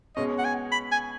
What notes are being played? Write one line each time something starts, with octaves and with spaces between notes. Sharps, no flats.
B2 G#3 C#4 D#5
F#5
G#5
B5
G#5